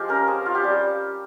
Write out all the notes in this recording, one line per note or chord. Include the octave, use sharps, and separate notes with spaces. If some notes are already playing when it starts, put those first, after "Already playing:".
Already playing: F3 G#3 F4 G4 F5
C#4 A#4
C4 G#4
F4
G4
G3